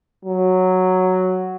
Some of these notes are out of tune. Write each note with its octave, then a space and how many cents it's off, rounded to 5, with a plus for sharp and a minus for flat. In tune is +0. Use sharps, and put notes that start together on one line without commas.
F#3 +0